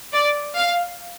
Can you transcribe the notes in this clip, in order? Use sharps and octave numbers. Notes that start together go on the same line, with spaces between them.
D5
F5